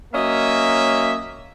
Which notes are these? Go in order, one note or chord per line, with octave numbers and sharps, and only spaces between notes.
F#3 A#3 C#4 D#5 E5